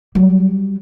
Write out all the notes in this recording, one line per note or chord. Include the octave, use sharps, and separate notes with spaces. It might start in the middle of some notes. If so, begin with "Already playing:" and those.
F#3 G3